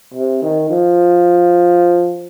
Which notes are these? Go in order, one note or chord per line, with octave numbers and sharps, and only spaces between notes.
C3
D#3
F3